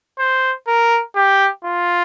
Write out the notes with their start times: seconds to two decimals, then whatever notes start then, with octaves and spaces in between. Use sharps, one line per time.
0.19 C5
0.67 A#4
1.15 G4
1.65 F4